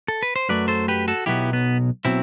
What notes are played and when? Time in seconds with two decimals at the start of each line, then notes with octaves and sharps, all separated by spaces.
0.08 A4
0.23 B4
0.36 C5
0.49 F#2 F#3 A3 B4 D5
0.68 A4 C5
0.88 G4 B4
1.08 F#4 A4
1.26 B1 B2 F#3 B3 E4 G4
1.53 B3
2.05 B2 F#3 C4 E4